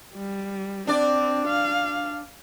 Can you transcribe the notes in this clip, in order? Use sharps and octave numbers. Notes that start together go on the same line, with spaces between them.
G3
C4 D4 D5
F5